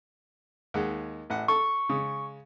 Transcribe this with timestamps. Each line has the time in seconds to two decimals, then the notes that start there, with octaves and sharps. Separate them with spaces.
0.74 D#2 G#3 F#5
1.30 A1 F#5
1.48 A4 C#6
1.89 C#3 G#3